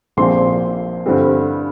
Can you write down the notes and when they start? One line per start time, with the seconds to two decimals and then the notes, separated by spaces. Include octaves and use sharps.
0.17 A#1 A#2 F3 C4 C6
1.06 G2 D3 G3 C4